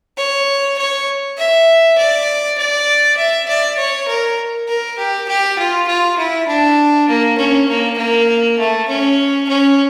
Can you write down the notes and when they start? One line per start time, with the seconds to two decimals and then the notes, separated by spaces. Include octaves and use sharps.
0.17 C#5
0.78 C#5
1.38 E5
1.98 D5
2.58 D5
3.17 E5
3.48 D5
3.77 C#5
4.08 A#4
4.68 A#4
4.98 G4
5.29 G4
5.58 F4
5.88 F4
6.18 E4
6.48 D4
7.09 A#3
7.38 C#4
7.69 A#3
7.98 A#3
8.59 A3
8.88 C#4
9.49 C#4